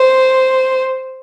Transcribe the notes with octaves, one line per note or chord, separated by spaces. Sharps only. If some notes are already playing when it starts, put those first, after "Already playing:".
Already playing: C5